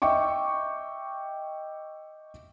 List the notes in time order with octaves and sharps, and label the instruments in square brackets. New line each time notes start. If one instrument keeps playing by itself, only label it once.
[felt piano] D#5 E5 G5 C#6 D6